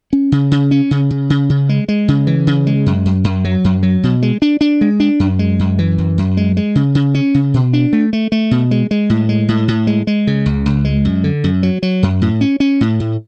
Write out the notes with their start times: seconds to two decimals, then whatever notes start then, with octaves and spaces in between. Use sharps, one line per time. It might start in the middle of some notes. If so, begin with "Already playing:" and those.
0.13 C#4
0.32 C#3
0.51 C#3
0.71 C#4
0.91 C#3
1.10 C#3
1.30 C#3
1.50 C#3
1.69 G#3
1.88 G#3
2.08 C#3
2.27 E3
2.47 C#3
2.67 G#3
2.86 F#2
3.06 F#2
3.24 F#2
3.45 F#3
3.64 F#2
3.83 F#3
4.03 B2
4.22 G#3
4.42 D4
4.61 D4
4.81 G#3
5.00 D4
5.20 F#2
5.39 G#3
5.59 F#2
5.79 E3
5.98 F#2
6.18 F#2
6.37 G#3
6.57 G#3
6.75 C#3
6.95 C#3
7.15 C#4
7.34 C#3
7.54 B2
7.73 D4
7.93 A3
8.13 A3
8.32 A3
8.51 B2
8.71 G#3
8.91 G#3
9.10 A2
9.29 G#3
9.48 A2
9.68 A2
9.87 G#3
10.07 G#3
10.27 C#3
10.46 C#2
10.66 C#2
10.85 G#3
11.05 F#2
11.24 D3
11.44 F#2
11.63 F#3
11.83 F#3
12.03 F#2
12.22 A2
12.41 C#4
12.60 C#4
12.81 A2
13.00 A2